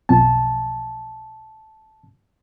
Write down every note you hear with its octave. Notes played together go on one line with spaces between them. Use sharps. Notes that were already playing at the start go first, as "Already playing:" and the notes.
B1 F2 A5